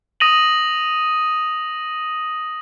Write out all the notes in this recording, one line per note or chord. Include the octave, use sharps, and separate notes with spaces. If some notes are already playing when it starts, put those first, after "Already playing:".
D#6 A#6 D#7 F#7